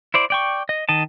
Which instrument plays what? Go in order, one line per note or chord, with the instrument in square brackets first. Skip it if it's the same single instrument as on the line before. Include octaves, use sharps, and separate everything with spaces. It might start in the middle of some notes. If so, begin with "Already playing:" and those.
[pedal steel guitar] E4 C5 D5
D5 G5 C#6
D#5
D#3 D#5 A5